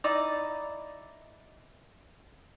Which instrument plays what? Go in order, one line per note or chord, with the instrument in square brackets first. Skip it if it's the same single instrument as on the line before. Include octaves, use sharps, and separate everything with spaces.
[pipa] D#4 E4 D5 D#5